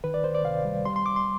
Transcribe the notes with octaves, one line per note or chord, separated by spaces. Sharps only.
D#3 B4
D5
D2 C5
D5
C3 F5
G3
G3 C6
C6
C2 D6
C6